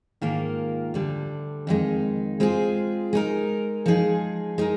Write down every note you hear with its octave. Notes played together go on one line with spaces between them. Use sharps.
G#2 D#3 A#3 F4 A#4
D2 D3 G3
F2 D#3 G#3 D#4
G#3 C4 F4 G#4
G#3 D#4 A#4
F3 G#3 D#4 G#4
G#3 D#4 A#4